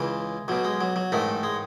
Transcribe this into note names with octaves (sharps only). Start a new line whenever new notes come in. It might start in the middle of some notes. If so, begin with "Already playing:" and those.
Already playing: C#2 C#3 E3 G#3
B1 B2 F#3
G#3
F#3
F#3
A1 G#2 D#3 A3
G#3